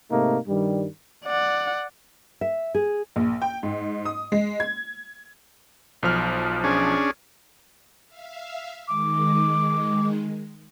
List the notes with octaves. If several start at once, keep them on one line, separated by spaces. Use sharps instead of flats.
G#2 C3 A3 A#3 D#4
G2 D#3 G3
D5 F#5
E5
G#4
A#1
G5
G#2
D#6
G#3
G#6
B1 F3 F6
C#4 D4 G#4
E5 F5
D#3 G#3 D6